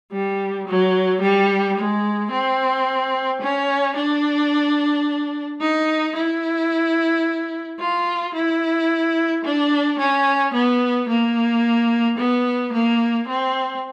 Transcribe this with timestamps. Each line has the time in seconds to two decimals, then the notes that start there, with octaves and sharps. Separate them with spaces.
0.12 G3
0.68 F#3
1.22 G3
1.77 G#3
2.31 C4
3.42 C#4
3.96 D4
5.61 D#4
6.16 E4
7.80 F4
8.34 E4
9.45 D4
9.99 C#4
10.54 B3
11.09 A#3
12.18 B3
12.73 A#3
13.28 C4